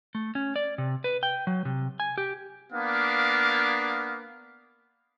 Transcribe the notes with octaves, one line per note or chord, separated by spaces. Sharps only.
A3
C#4
D5
C3
B4
G5
F#3
C3
G#5
G4
A#3 B3 D4 F5